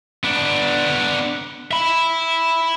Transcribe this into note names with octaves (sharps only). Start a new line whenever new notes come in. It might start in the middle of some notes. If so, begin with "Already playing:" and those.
B3 D4
E5 B5